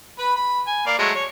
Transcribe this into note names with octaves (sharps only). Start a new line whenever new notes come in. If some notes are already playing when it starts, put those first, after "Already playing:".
B4 B5
B5
G#5
A#3 D5
F#3 G#3 A3
C#5